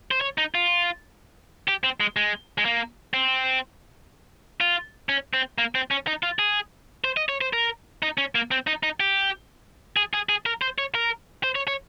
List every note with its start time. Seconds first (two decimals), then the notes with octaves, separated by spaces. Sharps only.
0.11 C5
0.21 C#5
0.38 D#4
0.55 F4
1.68 G4
1.84 C4
2.00 G#3
2.16 G#3
2.58 G#3
2.65 A#3
3.14 C4
4.61 F4
5.09 C#4
5.33 C4
5.58 A#3
5.75 C4
5.91 C#4
6.07 D#4
6.23 F4
6.39 G#4
7.04 C5
7.17 D#5
7.29 C#5
7.41 C5
7.53 A#4
8.03 D#4
8.18 C#4
8.35 A#3
8.51 C4
8.67 D#4
8.83 D#4
9.00 G4
9.97 G#4
10.14 G#4
10.29 G#4
10.46 A#4
10.62 C5
10.78 C#5
10.95 A#4
11.44 C5
11.55 C#5
11.68 C#5